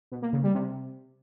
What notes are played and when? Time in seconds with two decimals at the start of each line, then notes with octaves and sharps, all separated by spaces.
0.12 B2
0.22 A#3
0.33 C#3
0.44 G3
0.54 C3